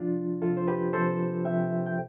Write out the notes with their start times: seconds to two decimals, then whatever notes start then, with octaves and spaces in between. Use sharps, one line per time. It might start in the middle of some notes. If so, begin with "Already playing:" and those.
Already playing: C3 F3 D4 F4
0.42 C3 F3 F4 A4
0.57 C5
0.68 G4 B4
0.93 C3 F3 A4 C5
1.45 C3 F3 E5 G5
1.86 G5